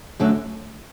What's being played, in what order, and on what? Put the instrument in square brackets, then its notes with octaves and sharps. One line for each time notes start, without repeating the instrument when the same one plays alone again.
[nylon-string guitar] F#2 D3 F#3 A3